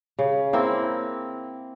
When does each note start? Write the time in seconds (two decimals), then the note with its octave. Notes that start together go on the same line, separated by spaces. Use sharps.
0.19 C#3
0.53 A#3 C4 E4